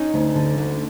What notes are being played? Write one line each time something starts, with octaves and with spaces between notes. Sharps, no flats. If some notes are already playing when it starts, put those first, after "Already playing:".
Already playing: C#4 D#4
D2
D3
D2